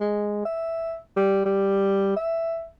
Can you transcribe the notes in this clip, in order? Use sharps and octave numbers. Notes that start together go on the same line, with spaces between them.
G#3
E5
G3
G3
E5